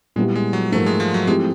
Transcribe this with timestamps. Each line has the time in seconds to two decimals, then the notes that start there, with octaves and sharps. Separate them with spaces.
0.16 A#2 G3 G#3 B3 E4 G4
0.35 G#3
0.53 F#3
0.72 G#2 F3 A3 A#3
0.86 G#3
1.00 F3
1.14 F#3
1.27 F3 G#3 A3 C4 E4 G4